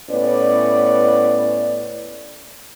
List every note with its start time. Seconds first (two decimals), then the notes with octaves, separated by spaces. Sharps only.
0.11 A2 B3 C#4 B4 D5